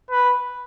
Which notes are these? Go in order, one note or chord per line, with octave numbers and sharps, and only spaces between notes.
B4